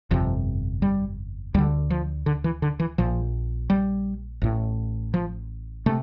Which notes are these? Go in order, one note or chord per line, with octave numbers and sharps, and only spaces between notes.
G1 F2 C3 F3
G3
D2 D3 G3
F3
D3
E3
D3
E3
A#1 A#2 F3
G3
A1 A2
F3
C3 A3